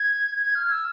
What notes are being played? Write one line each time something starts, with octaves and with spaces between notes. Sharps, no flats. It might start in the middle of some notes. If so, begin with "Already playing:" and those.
Already playing: G#6
G#6
F6
E6